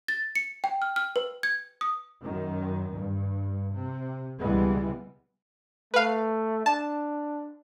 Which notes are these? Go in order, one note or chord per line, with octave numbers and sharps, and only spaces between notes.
A6
C#7
G5
F6
F6
B4
G#6
D#6
F#2 D#3
G2
C3
C#2 B2 E3 G3 G#3 B3
A3 B4 F5
D4 A5